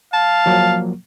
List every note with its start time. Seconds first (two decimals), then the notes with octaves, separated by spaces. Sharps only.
0.14 F5 A5
0.46 F3 F#3 A#3